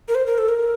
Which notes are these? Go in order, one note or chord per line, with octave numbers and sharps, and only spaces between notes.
A#4
C5
A#4
A4
A#4